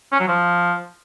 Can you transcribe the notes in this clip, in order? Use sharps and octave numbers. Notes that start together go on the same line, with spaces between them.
C#4
F#3
F3